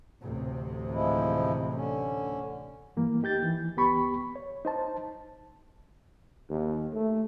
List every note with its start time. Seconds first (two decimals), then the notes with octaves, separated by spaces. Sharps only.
0.22 A1 D2 C3
0.91 F3 G#3 E4
1.74 D3 C#4
2.96 G2 E3 A#3
3.23 D#4 G4 G6 A6
3.42 E3
3.76 C#2 B3 G4 B5 C#6
4.36 C#5
4.65 D#4 C5 A5
6.49 D#2
6.94 A3